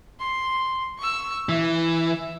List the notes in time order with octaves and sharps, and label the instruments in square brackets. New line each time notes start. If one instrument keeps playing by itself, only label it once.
[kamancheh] C6
C#6 E6
[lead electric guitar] E3 [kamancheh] E5